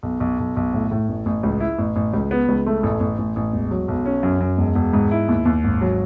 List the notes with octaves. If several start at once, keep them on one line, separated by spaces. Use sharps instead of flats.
B1
B1
B1
B1
A2
A2
A1
A1
C#2
E4
A1
A1
C#2
B3
C#2
A3
A1
A1
A1
A1
E1
F#3
B1
C#4
F#2
F#2
E1
E1
G#2
E4
D#2
D#2
G#1
F#3